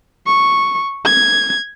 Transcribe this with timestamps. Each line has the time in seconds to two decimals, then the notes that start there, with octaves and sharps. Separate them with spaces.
0.27 C#6
1.05 G#6